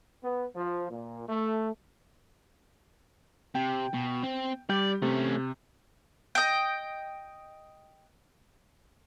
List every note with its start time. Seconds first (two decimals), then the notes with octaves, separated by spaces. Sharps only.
0.24 B3
0.56 F3
0.90 A#2
1.29 A3
3.55 C3 G5
3.94 B2
4.23 C4
4.69 G3 G4 D5 G6
5.02 C3 A3 C#4
6.35 D#5 G5